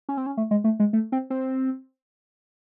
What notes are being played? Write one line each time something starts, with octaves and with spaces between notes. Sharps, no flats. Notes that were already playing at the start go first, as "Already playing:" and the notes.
C#4
C4
C#4
A3
G#3
A3
G#3
A3
C4
C4